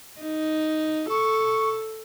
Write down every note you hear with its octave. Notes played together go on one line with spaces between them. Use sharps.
D#4
A4 C#6